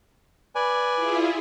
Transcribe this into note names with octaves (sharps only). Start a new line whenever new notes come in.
B4 D5 G#5
E4 F4 G#4